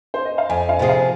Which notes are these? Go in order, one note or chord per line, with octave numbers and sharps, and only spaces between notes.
C5
D#5
F5
F2 G#5
F5
C3 F3 C4 G#4
F5